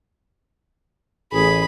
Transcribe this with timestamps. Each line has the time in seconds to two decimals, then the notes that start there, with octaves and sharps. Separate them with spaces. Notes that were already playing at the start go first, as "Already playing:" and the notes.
1.33 A1 G#4 B5